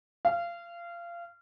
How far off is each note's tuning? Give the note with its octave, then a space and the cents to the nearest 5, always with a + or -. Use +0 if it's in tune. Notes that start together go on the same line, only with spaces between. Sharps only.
F5 -25